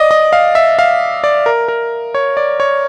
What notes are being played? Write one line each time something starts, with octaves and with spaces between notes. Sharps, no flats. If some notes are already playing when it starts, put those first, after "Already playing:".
Already playing: D5 D#5
D#5
F5
E5
F5
D5
A#4
A#4
C#5
D5
C#5